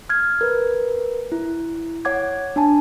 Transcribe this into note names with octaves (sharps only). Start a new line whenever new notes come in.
F6 G#6
A#4 B4
E4
C#5 F#5 D6 G#6
D4 G#5 A5